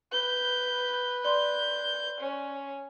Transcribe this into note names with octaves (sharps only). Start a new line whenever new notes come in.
B4 G6
D5 C6 F#6 G6
C#4